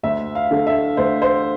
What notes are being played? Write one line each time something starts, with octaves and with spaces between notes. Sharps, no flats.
D2 E5
F5
D3 A3
E5
D2 C5
C5